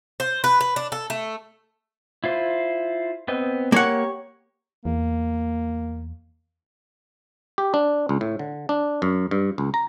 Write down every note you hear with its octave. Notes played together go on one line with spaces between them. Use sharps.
C5
B4
B4
D4
A4
A3
E4 F4 C5
B3 C4 D#5
A#3 G4 C#5 F#5 C#6
E2 A#3
G4
D4
C#2
A2
D3
D4
F#2
G2
C#2
A#5